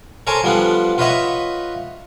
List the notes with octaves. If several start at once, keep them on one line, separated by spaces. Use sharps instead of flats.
A4 A#4 C5 C#5 G#5 A5
F3 G3 B3 D4 F4 A4
F4 B4 C#5 D#5 E5 F#5